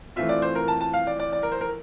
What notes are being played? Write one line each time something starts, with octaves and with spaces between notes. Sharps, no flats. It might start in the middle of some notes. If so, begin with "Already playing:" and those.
E3 A3 C4 F4 E5
D5
C5
A#4
A5
A5
F5
D5
D5
D5
A#4
C5
A#4